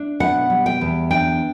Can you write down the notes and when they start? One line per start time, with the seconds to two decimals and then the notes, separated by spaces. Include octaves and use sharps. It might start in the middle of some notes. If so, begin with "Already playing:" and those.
Already playing: D4
0.20 B2 F#5
0.50 G3
0.66 G5
0.81 E2
1.11 D4 G5